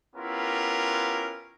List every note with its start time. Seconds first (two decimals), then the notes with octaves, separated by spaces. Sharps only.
0.16 B3 C#4 E4 F4 G4 A#4